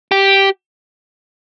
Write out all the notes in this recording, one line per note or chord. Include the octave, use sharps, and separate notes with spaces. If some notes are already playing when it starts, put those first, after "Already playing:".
G4